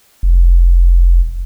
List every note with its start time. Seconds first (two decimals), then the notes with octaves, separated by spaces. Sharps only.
0.23 F1